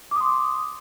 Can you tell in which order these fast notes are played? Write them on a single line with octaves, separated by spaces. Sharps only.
D6 D#6 C6